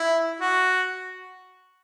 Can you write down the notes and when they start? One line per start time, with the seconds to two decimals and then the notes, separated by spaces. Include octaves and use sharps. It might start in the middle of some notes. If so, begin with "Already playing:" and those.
Already playing: E4
0.40 F#4